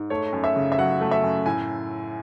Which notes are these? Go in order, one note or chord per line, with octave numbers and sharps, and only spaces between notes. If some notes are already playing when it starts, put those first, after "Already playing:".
Already playing: G#2
A3 C#5
F#2
E5
C#3
E5
F#3 F#5
A3
E5
F#2
A2 G#5